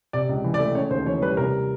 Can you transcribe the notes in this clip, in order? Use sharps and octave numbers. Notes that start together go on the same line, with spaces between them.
C3 D5
C#2
E3
D5
A3
C#3 C#5
D#2 C5
E3 C#5
G3 B4
C3 A#4